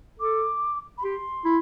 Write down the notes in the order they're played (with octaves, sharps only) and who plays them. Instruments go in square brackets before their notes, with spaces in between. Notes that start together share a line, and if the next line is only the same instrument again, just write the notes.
[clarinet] A4 [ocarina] D6
[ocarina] B5
[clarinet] G4 [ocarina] C6
[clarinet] E4